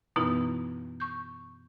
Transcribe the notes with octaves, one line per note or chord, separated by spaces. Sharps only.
F#2 B2 E3 B3 D#4 E4
C#6 G6